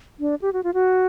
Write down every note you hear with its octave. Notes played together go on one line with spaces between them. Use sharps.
D4
G4
F#4
F4
F#4